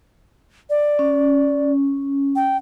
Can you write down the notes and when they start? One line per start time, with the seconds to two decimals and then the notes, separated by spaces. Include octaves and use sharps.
0.70 D5
0.99 C#4
2.36 G5